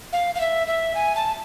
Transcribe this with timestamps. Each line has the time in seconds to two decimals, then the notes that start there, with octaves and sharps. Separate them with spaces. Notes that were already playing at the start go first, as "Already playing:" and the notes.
0.13 F5
0.35 F5
0.41 E5
0.67 E5
0.95 G#5
1.16 A5